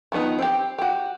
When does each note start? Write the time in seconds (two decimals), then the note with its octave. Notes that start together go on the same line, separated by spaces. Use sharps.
0.12 D#3 F3 B3 D#4
0.39 C4 G4
0.78 F#4 G4